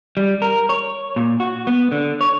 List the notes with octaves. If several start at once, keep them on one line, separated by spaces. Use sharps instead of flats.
G3
A#4
C#5
A#2
F#4
B3
D3
C#5